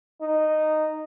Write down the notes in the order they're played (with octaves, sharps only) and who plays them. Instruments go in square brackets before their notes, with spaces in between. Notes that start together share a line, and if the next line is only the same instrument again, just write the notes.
[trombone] D#4